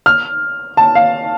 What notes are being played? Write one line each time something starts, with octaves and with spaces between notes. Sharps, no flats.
F6
A5
F5